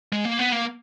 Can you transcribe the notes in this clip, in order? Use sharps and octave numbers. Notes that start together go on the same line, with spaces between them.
G#3
A#3
B3
A#3